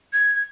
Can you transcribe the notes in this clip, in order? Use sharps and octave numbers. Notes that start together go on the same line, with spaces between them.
G#6